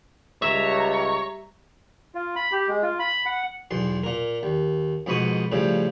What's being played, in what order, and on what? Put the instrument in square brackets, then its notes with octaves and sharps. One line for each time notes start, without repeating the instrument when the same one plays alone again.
[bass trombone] C#2 [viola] G3 A#5 [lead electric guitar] C#5 [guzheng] E5
[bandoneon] F4
B5
G4
G#3
F4
B5
F#5
[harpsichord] B1 E2 C6
A#2 A#4
D#2
F2 G#2 B2 B5 C#6 D#6
A2 C#3 F3 G3